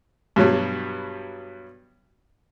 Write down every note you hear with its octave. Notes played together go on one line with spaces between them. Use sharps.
G2 B2 F#3 G3